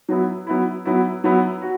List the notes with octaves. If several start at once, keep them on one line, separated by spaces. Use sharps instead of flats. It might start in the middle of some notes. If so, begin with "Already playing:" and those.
F#3 B3 E4
F#3 B3 E4
F#3 B3 E4
F#3 B3 E4
F#4